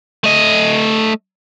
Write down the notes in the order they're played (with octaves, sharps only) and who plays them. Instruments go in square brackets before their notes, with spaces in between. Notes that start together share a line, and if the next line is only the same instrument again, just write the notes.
[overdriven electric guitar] A3 D#5